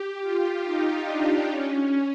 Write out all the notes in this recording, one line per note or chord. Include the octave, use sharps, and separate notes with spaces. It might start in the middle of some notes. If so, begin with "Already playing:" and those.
Already playing: G4
F4
D#4
D4
C#4